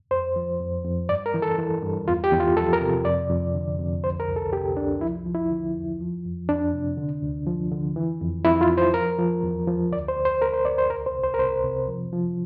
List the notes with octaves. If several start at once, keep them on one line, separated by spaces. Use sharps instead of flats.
F2 C5
F3
F2
F2
G2 D5
A#4
E3
A4
E3
G2
E2 F4
G4
E2
F4
F3 A4
A#4
C3
F2 D5
F2
D3
F2
C2 C5
A#4
C2
A4
C3 G4
C2 D4
F3 E4
F3
E4
D3
E2
F3
F2
F2 D4
C3
D3
D2
F3
D3
E3
F2
F2 E4
F4
F2
C5
F3 A#4
F3
E2
F3
D2 D5
C5
D2
C5
D2 A#4
C5
D2 D5
C5
C2 A#4
C5
C2
C5
A#4
C2 C5
C3
F3
F3